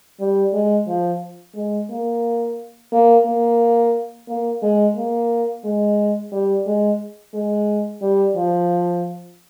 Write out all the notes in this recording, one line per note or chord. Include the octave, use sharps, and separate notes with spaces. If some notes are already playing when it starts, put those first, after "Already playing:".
G3
G#3
F3
G#3
A#3
A#3
A#3
A#3
G#3
A#3
G#3
G3
G#3
G#3
G3
F3